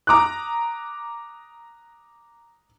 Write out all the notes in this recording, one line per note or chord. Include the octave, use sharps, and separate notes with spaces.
A#5 D6 D#6 F#6